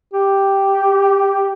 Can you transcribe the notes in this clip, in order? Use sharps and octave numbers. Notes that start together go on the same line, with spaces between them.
G4